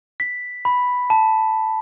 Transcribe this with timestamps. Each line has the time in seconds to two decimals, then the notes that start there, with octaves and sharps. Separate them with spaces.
0.20 B6
0.65 B5
1.10 A5